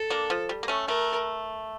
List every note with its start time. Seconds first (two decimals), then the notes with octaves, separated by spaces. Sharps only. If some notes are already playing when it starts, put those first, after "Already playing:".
Already playing: A4
0.10 A#3 D4
0.30 F3
0.49 G3
0.63 A#3
0.68 A3 C#4
0.88 A3 A#4